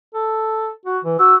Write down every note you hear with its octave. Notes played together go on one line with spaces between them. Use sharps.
A4
F#4
E3
F#4 E6